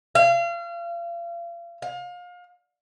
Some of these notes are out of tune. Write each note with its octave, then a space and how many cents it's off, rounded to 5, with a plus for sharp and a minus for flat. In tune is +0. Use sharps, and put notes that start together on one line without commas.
F5 -35
F5 +30